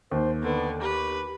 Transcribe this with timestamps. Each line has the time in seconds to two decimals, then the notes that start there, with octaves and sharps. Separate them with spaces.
0.11 D#2 C5
0.42 D3 B3
0.82 G4 B4